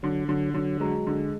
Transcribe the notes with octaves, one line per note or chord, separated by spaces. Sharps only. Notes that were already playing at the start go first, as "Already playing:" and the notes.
D3 F#3
D3 F#3
D3 F#3
F#3 G#3
D3